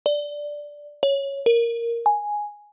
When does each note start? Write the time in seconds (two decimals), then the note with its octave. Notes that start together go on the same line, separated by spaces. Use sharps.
0.06 D5
1.03 C#5
1.46 A#4
2.06 G#5